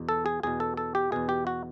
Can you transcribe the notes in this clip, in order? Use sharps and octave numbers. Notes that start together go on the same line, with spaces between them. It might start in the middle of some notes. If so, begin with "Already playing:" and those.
Already playing: E2 B2
A4
G#4
E2 B2 G#4
A4
A4
G4
E2 B2 G#4
G4
F#4